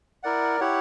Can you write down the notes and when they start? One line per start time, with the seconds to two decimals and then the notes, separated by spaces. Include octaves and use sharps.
0.23 E4 A#4 D5 F#5
0.60 E4 G4 C#5 F#5